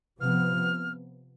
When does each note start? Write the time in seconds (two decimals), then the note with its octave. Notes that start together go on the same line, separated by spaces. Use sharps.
0.20 C3 F3 B3 F6